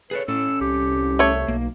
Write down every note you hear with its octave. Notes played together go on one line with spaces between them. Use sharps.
G#4 A4 B4 C#5
A2 C#4 A4 E6
C2 G4
A3 C#5
B1 A#3